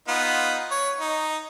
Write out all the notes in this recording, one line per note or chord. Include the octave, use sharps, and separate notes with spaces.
B3 D#4 F4
C#5
D#4